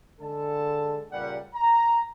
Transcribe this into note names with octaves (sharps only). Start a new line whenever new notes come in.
D3 G#3 A4 A5
C#2 A#2 G3 F#5
A#5